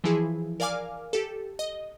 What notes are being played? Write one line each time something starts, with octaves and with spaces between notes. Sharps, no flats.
E3 F3 E4 G#4
A#4 D5 F5 G#5 D6 F6
G4 A4
D#5